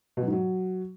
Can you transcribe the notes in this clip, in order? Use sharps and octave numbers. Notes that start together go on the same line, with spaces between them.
B2
F#3
G#2
F#3